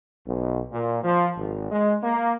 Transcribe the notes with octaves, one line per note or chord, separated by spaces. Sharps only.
B1
A#2
F3
G#1
G#3
A#3